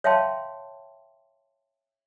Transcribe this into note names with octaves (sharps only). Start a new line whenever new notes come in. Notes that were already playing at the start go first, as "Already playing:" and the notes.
C#5 E5 F5 G5 A5 C6